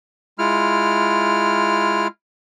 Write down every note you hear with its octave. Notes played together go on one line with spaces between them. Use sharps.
G#3 E4 F4 F6